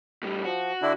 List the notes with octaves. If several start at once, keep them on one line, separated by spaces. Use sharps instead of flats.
A2 G3
F3 F#4
D3 D4 E4